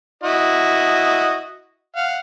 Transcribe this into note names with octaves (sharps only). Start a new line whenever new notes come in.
E4 F#4 D#5
F5 F#5